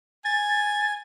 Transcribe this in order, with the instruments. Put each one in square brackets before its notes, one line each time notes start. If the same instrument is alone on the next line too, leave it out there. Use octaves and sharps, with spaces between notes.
[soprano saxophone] G#5 [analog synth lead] A6